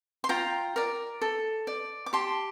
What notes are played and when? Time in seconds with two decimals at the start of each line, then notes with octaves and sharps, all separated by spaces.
0.24 C6
0.29 F4 G5 A#5
0.76 A#4 D5
1.21 A4
1.67 D5
2.06 D6
2.13 G4 A5 C6